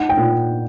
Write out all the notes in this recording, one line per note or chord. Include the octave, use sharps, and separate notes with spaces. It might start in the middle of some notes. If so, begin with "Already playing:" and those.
Already playing: D#4 F#5
G5
A#2